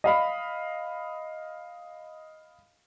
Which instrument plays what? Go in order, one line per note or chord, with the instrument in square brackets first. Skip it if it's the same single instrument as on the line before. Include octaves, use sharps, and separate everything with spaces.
[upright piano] D#5 F5 B5